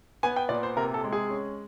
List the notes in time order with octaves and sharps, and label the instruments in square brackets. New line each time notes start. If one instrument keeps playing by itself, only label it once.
[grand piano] B3 G#5
G5
A#2 D5
C5
C3 A#4
A4
G#3
G#4
C#4